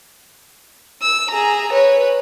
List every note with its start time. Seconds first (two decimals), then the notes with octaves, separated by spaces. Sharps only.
1.02 E6
1.30 G#4 A#5
1.72 B4 C#5